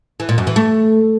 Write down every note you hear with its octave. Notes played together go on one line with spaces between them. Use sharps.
E3
A#2
F#2
E3
A3